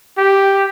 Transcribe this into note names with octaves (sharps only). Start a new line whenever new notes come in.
G4